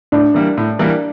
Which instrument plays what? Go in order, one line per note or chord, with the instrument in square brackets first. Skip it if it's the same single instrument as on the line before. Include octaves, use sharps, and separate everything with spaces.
[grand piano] A2 [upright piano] D4
[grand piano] E3 G3 A#3
A2
E3 G3 A#3